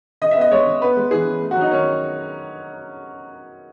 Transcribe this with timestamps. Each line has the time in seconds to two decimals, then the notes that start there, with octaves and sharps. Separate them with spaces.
0.21 C#3 D#5
0.31 B3 E5
0.41 D#5
0.51 G#3 C#5
0.66 C#3
0.81 B3 B4
0.97 G#3
1.11 E3 G#4
1.27 C#3
1.42 A3
1.51 F#3 F#4
1.61 D#4
1.71 D#3 C#4